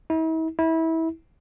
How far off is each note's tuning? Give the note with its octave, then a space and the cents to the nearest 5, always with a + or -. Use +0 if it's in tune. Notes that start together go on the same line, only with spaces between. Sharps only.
E4 -45
E4 -25